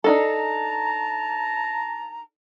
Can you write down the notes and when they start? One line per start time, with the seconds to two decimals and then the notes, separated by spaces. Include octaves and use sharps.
0.04 D4 D#4 A4 A5 A#5